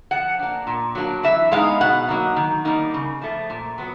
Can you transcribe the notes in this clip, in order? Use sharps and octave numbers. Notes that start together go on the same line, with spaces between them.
F3 F#5
A#3 D4
A#2
F#3 A#3 D4
E3 E5
G#3 B3 D#4 F5
B2 F#5
F#3 A#3 D#4
D#3
G3 A#3 D#4
C#3
F3 A3
A#2
F#3 B3